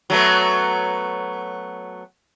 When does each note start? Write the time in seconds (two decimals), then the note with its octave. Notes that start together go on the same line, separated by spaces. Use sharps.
0.10 F#3 A3 B3